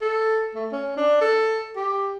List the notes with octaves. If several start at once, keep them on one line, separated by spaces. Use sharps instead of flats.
A4
A3
C#4
D4
A4
G4